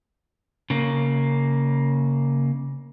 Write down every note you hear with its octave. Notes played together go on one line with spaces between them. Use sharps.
C#3 A#3